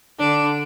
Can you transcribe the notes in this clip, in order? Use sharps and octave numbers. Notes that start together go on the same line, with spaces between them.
D3 D4